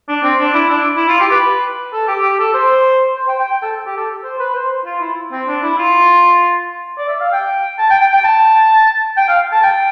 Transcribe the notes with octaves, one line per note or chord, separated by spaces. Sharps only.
D4
C4
D4
E4
D4
E4
F4
G4
B4
A4
G4
G4
A4
C5
C5
G5
G5
G5
A4
G4
A4
C5
B4
C5
F4
E4
C4
D4
E4
F4
D5
E5
F5
G5
A5
G5
G5
G5
A5
G5
F5
A5
G5